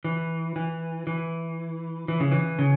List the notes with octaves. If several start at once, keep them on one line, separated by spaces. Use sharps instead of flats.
E3
E3
E3
E3
C#3
E3
C#3